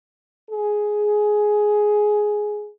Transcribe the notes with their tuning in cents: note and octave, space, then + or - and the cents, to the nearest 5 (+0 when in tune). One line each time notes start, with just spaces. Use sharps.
G#4 +10